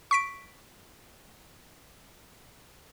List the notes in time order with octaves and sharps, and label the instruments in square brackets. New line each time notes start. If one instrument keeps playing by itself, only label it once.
[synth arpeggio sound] C#6 B6 D7